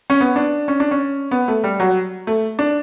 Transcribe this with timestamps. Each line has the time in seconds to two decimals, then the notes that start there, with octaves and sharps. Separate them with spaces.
0.10 C#4
0.21 B3
0.36 D4
0.68 C#4
0.80 D4
0.91 C#4
1.31 B3
1.48 A3
1.64 G3
1.80 F#3
2.27 A3
2.59 D4